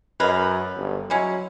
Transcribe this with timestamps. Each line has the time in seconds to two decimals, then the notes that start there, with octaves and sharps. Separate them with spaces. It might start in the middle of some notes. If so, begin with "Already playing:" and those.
0.20 F#2 G#3 A#4 B4
0.77 G1
1.10 F#3 G#3 C#4 E4